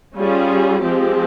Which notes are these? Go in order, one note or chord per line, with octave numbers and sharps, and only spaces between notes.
G3 C#4 F4 G#4
F3 G#3 C4 G4